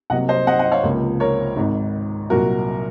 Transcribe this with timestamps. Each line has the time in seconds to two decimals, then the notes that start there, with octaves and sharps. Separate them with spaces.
0.10 C2 C3 F#3 A#3 D#5 F#5
0.28 C5 D#5
0.47 D#5 F#5
0.59 D#5 F#5
0.72 C#5 F5
0.83 C#2 C3 F3 A#3
1.20 A#4 C#5
1.56 G#1 G#2 D#3
2.30 C2 A#2 F#3 F#4 A#4